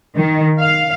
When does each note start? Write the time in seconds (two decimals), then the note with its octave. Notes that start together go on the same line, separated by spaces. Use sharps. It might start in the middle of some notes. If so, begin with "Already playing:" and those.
0.17 D#3
0.59 F5